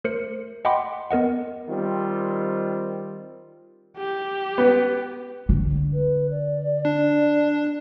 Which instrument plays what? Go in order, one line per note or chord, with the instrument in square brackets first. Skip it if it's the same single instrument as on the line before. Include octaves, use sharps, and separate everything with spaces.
[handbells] A3 A#4 C5 C#7
D#5 F#5 G5 B5 C6 D6
B3 A#4 D#5 F#5
[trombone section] D#3 G3 C4 F4
[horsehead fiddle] G4
[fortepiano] B3
[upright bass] D3
[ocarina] B4
D5
[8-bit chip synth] D4